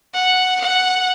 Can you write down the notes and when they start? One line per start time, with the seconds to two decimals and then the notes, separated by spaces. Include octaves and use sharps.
0.14 F#5
0.61 F#5